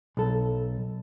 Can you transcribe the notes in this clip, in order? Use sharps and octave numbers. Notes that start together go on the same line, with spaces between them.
B1 A4